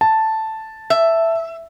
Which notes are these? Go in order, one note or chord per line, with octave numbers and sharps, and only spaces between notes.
A5
E5